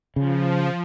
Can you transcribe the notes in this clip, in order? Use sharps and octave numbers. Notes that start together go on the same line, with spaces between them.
C#3 F3